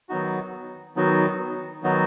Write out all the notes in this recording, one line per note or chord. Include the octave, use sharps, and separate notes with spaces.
D#3 F#3 B3 D#4 F#4
D#3 F#3 B3 D#4 F#4
D#3 F#3 B3 D#4 F#4